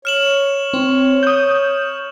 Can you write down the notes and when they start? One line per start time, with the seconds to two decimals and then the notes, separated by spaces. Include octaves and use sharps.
0.05 C#5 F6 E7 F#7
0.74 C4
1.23 D#6 G6